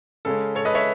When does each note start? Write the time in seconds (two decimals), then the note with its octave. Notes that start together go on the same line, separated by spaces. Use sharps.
0.25 C#3 G#3 C#4 A4
0.55 A4 C#5
0.65 B4 D#5
0.75 C#5 E5